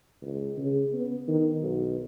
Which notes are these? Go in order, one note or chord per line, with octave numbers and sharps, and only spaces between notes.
C#2
C#3
B3
D#3
B1